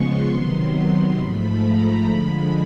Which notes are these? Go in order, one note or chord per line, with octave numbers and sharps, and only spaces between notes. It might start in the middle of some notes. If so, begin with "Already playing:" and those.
Already playing: C#3 F3 G#3 B3 C6 C#6
C3 D#3 F#3 B3 C6
G#2 F3 A3 B5
A#5
D3 F3 G#3 B5